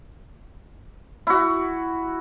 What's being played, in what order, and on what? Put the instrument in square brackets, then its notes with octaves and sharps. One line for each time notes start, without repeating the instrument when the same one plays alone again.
[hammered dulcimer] E4 F#4